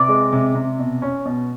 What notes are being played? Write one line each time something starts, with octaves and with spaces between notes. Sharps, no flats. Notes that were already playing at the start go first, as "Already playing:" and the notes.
Already playing: C3 D5
G#3
C3
C3
B2
C#4
B2